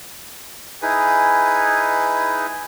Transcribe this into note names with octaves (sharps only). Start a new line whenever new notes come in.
D#4 E4 G#4 B4